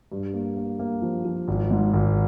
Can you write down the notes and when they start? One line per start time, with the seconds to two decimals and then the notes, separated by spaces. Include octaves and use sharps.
0.12 G2
0.34 A#3
0.57 A#3
0.79 A#3
1.02 F3
1.25 F3
1.48 G#1
1.71 G#2
1.93 G#1